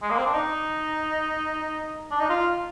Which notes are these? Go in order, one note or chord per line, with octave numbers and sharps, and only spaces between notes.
G#3
A#3
C4
D4
D#4
D4
D#4
F4